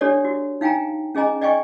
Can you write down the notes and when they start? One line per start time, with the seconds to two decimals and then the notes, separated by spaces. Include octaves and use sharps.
0.01 D4 G4 A4 C#5 D5
0.24 F#4
0.61 D#4 F5 G5 G#5 A#5
1.15 C#4 G#4 D#5 G#5 A#5
1.41 D5 D#5 G5 G#5 C#6